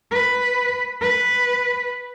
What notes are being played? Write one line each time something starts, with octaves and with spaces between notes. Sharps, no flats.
B4
B4